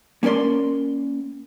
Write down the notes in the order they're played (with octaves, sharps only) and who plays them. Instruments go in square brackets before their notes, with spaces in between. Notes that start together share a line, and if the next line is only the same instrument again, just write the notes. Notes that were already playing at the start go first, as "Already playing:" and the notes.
[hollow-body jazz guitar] A#3 C#4 A#4 D5 C6